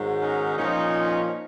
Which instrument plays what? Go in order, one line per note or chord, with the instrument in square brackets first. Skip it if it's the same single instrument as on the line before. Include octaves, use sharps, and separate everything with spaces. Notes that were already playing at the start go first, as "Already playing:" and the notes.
Already playing: [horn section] G#2 D#3 F#3
C#4 D#4
A#2 F3 C#4 D#4